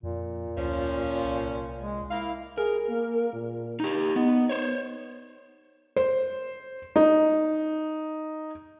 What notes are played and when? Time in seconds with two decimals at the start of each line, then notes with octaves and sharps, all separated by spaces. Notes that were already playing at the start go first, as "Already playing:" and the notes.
0.03 F2 A#2
0.57 D2 F3 C#4
1.24 C2
1.81 G#3
2.10 A#3 E4 F5
2.58 G#4 A#4
2.89 A#3
3.33 A#2
3.80 D#4 G4
4.16 B3 D#4
4.49 C5 C#5
5.96 C5
6.96 D#4